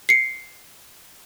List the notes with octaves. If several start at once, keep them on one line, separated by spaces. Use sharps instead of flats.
C7 C#7